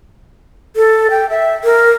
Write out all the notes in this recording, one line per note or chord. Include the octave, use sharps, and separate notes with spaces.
A4
G5
E5
A#4